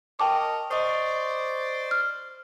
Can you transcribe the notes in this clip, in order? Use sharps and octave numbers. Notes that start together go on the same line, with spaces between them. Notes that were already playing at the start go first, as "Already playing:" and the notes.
A#4 C#5 D#5 G5 A5 D6
C5 D5 D#5 C#6 D#6
F6